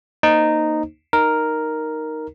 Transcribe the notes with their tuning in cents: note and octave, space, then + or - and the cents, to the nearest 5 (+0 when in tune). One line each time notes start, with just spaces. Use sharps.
A#3 +0 D#4 -10 C5 +0
D#4 +0 A#4 +0